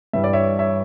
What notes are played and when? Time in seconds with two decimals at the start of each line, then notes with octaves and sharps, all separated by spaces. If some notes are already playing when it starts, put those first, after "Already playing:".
0.13 G2 E3 G3 E5
0.24 D5
0.33 C#5 E5
0.59 C#5 E5